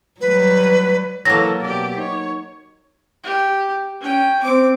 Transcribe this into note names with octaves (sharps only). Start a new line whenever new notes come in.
F#3 G3 B4
E3 F#3 A#3 A4 A#6
B2 G4 D5
D#4 C#5
G4
C#4 G5
C4 D6